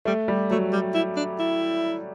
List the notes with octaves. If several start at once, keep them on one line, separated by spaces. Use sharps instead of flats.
G3 A3
G3
F#3 A3
G3
E4
D4
E4